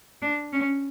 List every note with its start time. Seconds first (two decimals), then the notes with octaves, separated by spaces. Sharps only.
0.22 D4
0.53 C#4